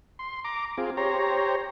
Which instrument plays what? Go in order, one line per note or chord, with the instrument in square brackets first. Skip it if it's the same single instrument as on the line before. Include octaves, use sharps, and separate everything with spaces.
[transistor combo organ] C6
A#5 D6
C4 F4 G#4
G4 C5 C#5 A#5